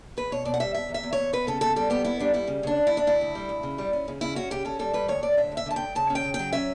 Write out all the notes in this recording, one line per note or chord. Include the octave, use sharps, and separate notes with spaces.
E2 B4
B2 C#5
B2 D5
F#5
G3 E5
B2 E5
E2
E5
E2
C#5
E2
B3 B4
C#3 A4
B3 A4
G3 A4
B3 G4
B3 E4
G3 D4
G3 E4
C#3
C#3 D4
D2
E4
D2
D4
D2 E4
D2
G3
D2
C#3
G3
C#4
C#3
C#3 E4
C#4 F#4
C#3 G4
C#4 A4
G3 A4
G3 B4
D2 C#5
D2 D5
D3 E5
D2
E5
D3 A5
D2 G5
C#3 A5
C#4
G5
C#3
G5
F#3
C#4 E5